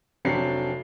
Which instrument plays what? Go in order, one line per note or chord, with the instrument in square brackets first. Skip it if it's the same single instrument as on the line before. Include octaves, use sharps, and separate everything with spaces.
[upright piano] F1 F#3 C4 D4 C7